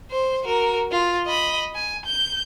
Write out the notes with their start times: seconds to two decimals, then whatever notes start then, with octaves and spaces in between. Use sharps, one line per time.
0.11 C5
0.44 F#4 A#4
0.92 F4
1.26 D#5 B5
1.75 G#5
2.06 G6